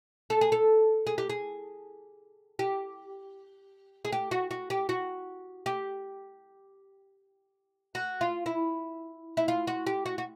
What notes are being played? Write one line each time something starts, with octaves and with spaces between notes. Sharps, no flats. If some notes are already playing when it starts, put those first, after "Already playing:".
A4
G#4
A4
G#4
G4
G#4
G4
G#4
G4
F#4
F#4
G4
F#4
G4
F#4
F4
E4
E4
F4
F#4
G4
F#4
F#4